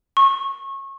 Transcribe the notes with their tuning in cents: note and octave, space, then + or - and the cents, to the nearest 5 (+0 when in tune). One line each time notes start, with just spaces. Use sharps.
C#6 -25